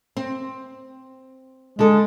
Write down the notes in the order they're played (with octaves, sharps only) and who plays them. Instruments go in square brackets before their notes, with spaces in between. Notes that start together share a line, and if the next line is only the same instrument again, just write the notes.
[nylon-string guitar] C4
[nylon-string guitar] D3 A4 [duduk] G#3